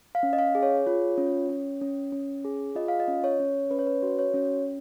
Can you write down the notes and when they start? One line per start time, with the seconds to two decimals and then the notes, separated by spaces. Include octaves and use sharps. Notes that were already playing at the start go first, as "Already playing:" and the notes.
0.15 F5
0.23 C#4
0.33 D#5
0.39 F5
0.55 G#4
0.63 C#5
0.87 F4
1.18 C#4
1.49 C#4
1.81 C#4
2.12 C#4
2.45 G#4
2.75 F4 D#5
2.88 F5
3.00 D#5
3.08 C#4
3.24 C#5
3.40 C#4
3.70 C#4 B4
3.79 C#5
3.87 B4
4.03 F#4
4.19 C#5
4.34 C#4